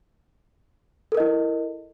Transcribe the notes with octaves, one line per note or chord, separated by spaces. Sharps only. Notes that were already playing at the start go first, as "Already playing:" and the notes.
E4 A4 A#4 D#5